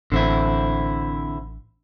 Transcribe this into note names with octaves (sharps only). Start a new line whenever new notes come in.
A1 D3 C4 E4